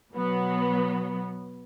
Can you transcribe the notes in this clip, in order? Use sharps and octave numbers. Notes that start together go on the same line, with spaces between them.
B2 F#3 B3